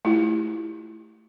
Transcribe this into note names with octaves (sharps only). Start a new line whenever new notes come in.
A3 E4 F4 G4